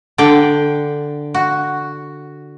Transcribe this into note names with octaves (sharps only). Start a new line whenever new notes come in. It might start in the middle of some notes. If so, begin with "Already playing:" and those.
D3 D5 G5
F#4